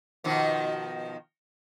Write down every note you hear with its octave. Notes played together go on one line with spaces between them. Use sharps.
B2 D#3 F3